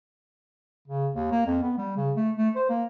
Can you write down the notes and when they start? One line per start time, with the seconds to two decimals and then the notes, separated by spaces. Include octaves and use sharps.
0.88 C#3
1.12 D#2
1.31 A#3
1.46 F2
1.63 B3
1.78 G3
1.97 C#3
2.16 A3
2.37 A3
2.56 C5
2.69 A#3